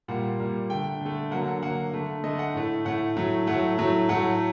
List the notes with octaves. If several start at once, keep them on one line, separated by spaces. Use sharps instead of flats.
A#2 G3 A#3 F#5
A#2 G3 A#3
D3 A3 G5
D3 A3
D3 F#3 A#3 F#5
F#5
D3 F#3 A#3 F#5
D3 A3
D3 A3 D#5
F#5
A2 A3
A2 A3 F#5
A2 F#3 A3
A2 F#3 A3 F#5
A2 F#3 A3
A2 F#3 A3 F#5